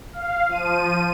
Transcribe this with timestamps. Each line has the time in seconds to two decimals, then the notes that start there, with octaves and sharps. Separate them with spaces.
0.12 F5
0.48 F3 D#7